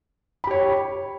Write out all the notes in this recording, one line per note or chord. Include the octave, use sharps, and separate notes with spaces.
G4 C#5 B5